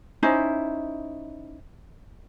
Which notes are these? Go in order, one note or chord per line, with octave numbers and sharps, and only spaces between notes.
C#4 D#4 E4 C5